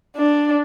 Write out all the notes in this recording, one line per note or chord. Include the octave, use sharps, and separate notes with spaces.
D4